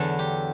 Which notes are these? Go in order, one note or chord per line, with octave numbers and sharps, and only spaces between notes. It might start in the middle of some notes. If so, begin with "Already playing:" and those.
Already playing: E2 D3 F#3 A4
G4